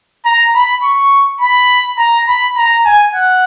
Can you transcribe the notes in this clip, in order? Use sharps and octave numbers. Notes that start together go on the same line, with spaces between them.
A#5
B5
C#6
B5
A#5
B5
A#5
G#5
F#5